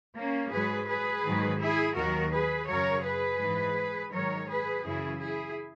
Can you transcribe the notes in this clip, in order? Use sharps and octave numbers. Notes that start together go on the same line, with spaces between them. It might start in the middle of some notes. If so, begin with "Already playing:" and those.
A#3 C#4
G#2 F#3 G#4 B4
G#4 B4
G#2 D#3 F#3
E4 G#4
D#2 D#3 F#3 F#4 A#4
G#4 B4
F#2 C#3 F#3 A#4 C#5
G#4 B4
G#2 E3
G#2 D#3 F#3 A#4 C#5
G#4 B4
F#2 C#3 E3 E4 G#4
E4 G#4